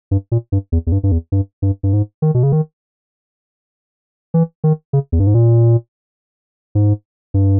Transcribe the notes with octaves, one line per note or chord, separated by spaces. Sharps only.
G2
A#2
G2
E2
E2
G2
G2
E2
G2
G2
G2
G#2
D#3
B2
C#3
D#3
E3
D#3
C#3
E2
G2
G#2
A#2
G#2
G2